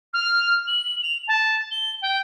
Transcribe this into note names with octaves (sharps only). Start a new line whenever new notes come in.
F6
F#7
F7
A5
G7
G5